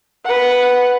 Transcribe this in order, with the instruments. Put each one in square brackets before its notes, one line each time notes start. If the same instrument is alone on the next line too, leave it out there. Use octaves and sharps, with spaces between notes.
[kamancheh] B4 F#5